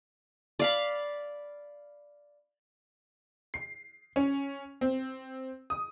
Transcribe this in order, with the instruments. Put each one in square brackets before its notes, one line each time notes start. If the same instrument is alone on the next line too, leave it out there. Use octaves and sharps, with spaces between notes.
[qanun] D5 F5 B5
[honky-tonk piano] C7
C#4
C4
D#6